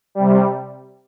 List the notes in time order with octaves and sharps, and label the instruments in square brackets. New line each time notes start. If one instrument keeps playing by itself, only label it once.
[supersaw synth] C3 G3